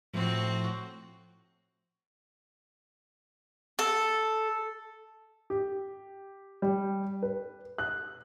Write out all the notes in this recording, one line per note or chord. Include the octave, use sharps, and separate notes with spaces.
A2 F3 C4 F#4
A4
G4
G3
B4
F#6